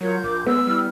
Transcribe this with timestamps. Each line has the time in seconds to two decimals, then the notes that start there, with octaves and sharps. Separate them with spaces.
0.01 F#3 F4 A#4 C#5 G6
0.24 A#1 D6
0.46 G#3 B3 E6
0.67 G3 E4 F6